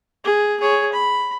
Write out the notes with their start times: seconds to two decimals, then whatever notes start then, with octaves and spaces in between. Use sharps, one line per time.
0.24 G#4
0.60 G#4 C#5
0.93 B5